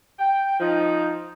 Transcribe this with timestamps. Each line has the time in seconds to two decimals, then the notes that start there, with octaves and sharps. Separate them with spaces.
0.19 G5
0.59 F3 D#4